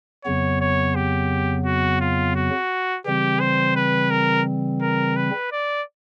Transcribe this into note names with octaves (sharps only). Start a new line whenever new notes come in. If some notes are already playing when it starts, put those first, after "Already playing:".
F2 C#3 F#3 B3 C#5
C#5
G4
F#4
F4
F#4
C#3 E3 G3 C4 G4
C5
B4
A#4
A#4
B4
D5